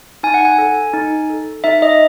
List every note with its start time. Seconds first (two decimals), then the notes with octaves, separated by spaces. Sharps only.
0.23 D#4 G#5
0.34 F#5
0.45 G#5
0.58 A4
0.93 D#4
1.30 A4
1.64 D#4 E5
1.82 D#5